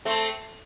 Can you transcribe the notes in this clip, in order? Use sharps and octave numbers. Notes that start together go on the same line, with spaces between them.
A3 C4